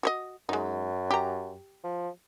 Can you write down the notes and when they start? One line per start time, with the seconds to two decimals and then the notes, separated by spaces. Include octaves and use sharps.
0.03 F#4 C#5 D#5
0.49 F#2 G#3 D#4
1.11 G4 A#5
1.84 F3